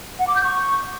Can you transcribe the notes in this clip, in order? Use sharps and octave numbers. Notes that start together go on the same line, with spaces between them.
F#5
D6
G6
C#6